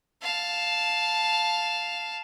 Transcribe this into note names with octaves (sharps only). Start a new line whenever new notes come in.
F5 A5